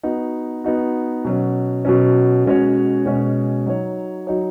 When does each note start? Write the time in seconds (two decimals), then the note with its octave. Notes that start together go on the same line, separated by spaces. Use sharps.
0.03 B3 D#4 F#4
0.64 B3 D#4 F#4
1.25 B2 F#3 C#4
1.85 B2 F#3 C#4
2.45 B2 G#3 C#4 F#4 C#5
3.06 B2 G#3 C#4 F#4 C#5
3.66 F#3 D#4 F#4 C#5
4.27 F#3 D#4 F#4 C#5